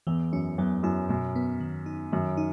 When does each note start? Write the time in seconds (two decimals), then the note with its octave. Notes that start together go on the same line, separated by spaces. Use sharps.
0.07 E2 E3
0.32 F#2 C#4
0.58 E2 F#3
0.83 F#2 E4
1.09 F#2 B2
1.35 B3
1.60 D#3
1.86 D#4
2.13 F#2 D#3
2.37 D#4